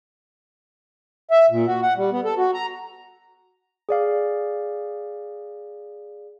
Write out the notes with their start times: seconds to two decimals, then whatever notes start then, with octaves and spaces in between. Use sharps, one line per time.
1.31 E5
1.51 A#2
1.67 F#4
1.83 F#5
1.97 G3
2.12 B3
2.25 A4
2.37 F#4
2.54 A#5
3.89 G#4 D5 F5